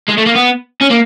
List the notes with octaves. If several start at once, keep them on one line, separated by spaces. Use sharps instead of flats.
G#3
A3
A#3
B3
C#4
A#3